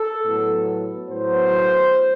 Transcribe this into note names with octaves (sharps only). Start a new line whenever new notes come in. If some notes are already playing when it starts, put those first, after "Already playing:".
Already playing: A4
A2 F#3 B3
A2 F#3 B3 C5